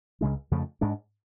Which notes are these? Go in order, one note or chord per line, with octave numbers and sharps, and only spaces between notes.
C#2 C#3 G#3 D4
F2 C#3 F3 A3
G#2 G#3 D4